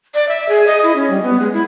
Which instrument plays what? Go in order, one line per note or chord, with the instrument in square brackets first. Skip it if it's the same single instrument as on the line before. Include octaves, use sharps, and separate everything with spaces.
[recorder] D5
E5
G#4
D#5
E4
C#4
G3
B3
G#3
E4